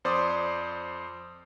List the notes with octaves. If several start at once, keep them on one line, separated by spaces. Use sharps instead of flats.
F2 C5 D5 C6 D6 D#6